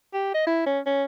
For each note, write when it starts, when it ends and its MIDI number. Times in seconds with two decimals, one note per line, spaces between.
0.14 0.33 67
0.35 0.42 75
0.47 0.64 64
0.66 0.80 61
0.86 1.05 61